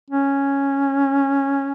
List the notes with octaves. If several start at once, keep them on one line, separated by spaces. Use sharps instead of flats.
C#4